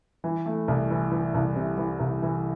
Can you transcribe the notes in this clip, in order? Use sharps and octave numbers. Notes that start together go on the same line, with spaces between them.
E3
A3
C2
E3
E3
C2
C3
E3
C2
E3